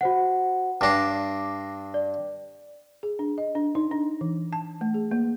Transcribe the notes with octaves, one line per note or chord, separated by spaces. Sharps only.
F#4 C5 F#5
G2 D4 D6 A#6 C7
D5
G#4
D4
D#5
D4
D#4
D4
E3
A5
A3
G#4
A#3